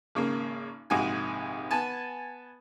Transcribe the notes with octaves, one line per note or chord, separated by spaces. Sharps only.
G#1 C#3 A#3
A#1 G#2 C3 F#4 G#5
B3 G#5 A5